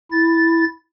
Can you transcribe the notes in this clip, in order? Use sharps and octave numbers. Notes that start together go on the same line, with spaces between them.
E4 A6